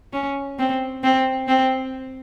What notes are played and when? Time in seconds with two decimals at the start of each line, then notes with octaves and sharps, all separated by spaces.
0.13 C#4
0.59 C4
1.03 C4
1.48 C4